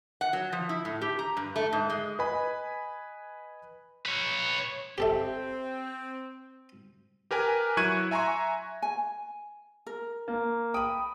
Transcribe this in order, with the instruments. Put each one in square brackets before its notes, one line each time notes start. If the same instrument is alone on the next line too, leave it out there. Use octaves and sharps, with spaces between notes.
[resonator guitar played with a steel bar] F#5
F#3
F3
E4
A2
G4
A#5
G2
A3
G#2
G#3
[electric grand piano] B4 D#5 G#5 B5
[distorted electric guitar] B4 C#5
[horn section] C4 [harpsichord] G4 A4 E5
[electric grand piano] G4 A#4 B4 G#5
F#3 E4 C#6 F#6 G#6 D#7
E5 G#5 A#5 C6 C#6
[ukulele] G#5
A#4
[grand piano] A#3
[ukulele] G5 B5 [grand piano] D#6